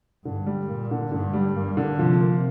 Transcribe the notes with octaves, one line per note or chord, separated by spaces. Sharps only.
G2 D3
G3
A#2 A#3
D3
G2 D3
G3
G2 A#3
D3
C3 F3
A#3